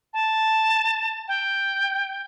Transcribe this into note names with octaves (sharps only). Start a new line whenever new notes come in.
A5
G5